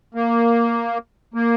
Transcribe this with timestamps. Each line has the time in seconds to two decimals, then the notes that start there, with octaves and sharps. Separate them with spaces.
0.15 A#3
1.34 A#3